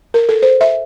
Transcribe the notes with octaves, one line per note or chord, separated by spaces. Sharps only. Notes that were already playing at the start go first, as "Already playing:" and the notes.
A#4
A4
C5
E5